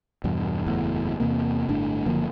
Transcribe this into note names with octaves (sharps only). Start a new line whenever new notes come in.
E2 G2 B2
F#1 E2 A2
E2 C3 A#3
G1 A2 D4
F#1 D3 F3 A#3